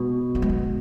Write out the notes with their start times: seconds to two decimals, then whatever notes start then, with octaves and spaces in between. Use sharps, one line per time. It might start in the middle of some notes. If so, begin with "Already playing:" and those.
Already playing: B2 G#3
0.35 B3
0.42 G#3
0.49 B3